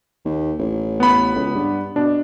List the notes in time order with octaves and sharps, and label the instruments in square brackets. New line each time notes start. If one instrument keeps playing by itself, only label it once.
[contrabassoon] D#2
A1
[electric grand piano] B3 B5
[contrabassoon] C#2
G2
[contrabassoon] B2 [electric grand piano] D4